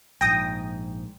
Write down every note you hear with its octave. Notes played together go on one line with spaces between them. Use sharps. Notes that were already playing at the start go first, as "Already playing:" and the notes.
A#1 G#2 G5 D#6 A#6